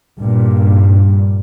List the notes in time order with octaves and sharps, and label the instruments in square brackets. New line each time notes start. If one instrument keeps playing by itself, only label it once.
[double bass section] G2 A#2